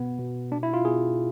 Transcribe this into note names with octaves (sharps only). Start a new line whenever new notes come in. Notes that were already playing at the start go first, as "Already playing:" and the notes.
Already playing: B2 B3
B2
B2 D4
E4
F4
B2 G#4